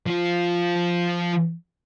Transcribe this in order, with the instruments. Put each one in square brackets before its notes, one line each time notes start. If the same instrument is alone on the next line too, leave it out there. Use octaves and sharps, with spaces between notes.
[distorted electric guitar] F3 F4